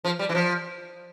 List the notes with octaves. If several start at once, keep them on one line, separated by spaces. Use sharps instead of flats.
F3
G3
E3
F3